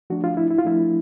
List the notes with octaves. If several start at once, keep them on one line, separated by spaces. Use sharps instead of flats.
F3 A3 D4 F#4
F4
E4
E4
F4
F3 A3 D4 E4